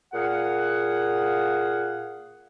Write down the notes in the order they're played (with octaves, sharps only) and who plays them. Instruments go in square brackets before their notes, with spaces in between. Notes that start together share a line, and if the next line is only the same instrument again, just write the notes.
[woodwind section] A#2 G#4 F5 F#5